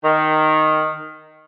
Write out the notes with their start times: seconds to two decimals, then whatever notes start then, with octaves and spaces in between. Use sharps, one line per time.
0.04 D#3